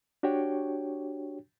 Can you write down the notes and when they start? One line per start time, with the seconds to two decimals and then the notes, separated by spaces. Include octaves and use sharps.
0.23 D4 F#4 G4 C#5 G5